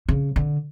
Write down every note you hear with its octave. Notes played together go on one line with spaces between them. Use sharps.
C#3
D3